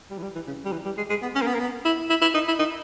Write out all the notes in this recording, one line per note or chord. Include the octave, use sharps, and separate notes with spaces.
G3
E3
G3
E3
C#3
G3
E3
G3
G#3
G#3
B3
C#4
A#3
B3
A#3
B3
E4
E4
E4
D#4
E4
D#4